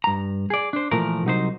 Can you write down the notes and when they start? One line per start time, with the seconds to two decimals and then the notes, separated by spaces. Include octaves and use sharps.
0.04 G2 A#5
0.50 G#4 D5
0.73 D4 C5
0.91 A#2 E3 F3 A3 A#4
1.25 C2 F#3 D#4 C5